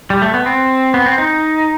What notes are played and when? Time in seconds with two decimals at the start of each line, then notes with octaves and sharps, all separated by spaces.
0.10 G3
0.22 A3
0.34 B3
0.46 C4
0.94 B3
1.06 C4
1.18 D#4